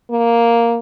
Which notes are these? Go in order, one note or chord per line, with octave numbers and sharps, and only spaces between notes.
A#3